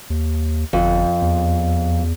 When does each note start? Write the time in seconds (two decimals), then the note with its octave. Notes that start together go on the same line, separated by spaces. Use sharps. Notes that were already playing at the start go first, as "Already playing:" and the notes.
0.10 D#2
0.73 G1 F2
1.22 E2